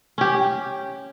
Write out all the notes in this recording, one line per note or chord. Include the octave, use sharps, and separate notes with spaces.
C#4 G4